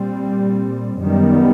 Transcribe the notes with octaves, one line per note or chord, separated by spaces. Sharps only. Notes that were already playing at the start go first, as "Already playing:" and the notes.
Already playing: A#2 G3 C4
F#2 D#3 G3 B3